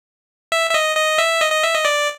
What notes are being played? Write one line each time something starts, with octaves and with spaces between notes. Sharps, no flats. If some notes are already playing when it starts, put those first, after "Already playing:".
E5
E5
D#5
D#5
E5
D#5
D#5
E5
D#5
D5